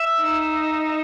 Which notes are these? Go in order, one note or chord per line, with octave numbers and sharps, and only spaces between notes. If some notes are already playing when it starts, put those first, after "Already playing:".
Already playing: E5
D#4